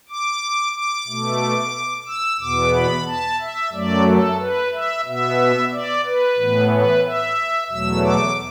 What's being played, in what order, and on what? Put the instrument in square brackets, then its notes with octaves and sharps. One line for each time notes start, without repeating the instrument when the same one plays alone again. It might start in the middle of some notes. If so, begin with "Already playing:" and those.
[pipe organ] D6
D6
B2 A3
E6
E2 B2 B3 D6
B5
A5
E5
F#2 F#3 A3 D5
A4
B4
E5
B2 B3 E5
D5
B4
A2 E3 B3
B4
E5
E2 B2 F#3 A3 E6
D6